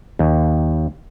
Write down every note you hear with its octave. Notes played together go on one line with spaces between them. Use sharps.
D#2